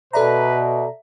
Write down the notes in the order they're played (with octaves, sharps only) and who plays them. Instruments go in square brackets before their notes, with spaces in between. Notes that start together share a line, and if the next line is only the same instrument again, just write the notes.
[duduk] B2 [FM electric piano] A4 D5 A#5 [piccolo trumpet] B4 [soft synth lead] E5